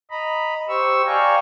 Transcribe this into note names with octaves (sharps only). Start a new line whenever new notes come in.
D#5 A#5 B5
G4 C5 C#6 E6
D5 F5 G5 G#5 A#5 C#6